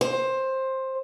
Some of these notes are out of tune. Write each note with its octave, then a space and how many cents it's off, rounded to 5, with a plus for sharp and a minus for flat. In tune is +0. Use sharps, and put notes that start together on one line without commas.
C5 +15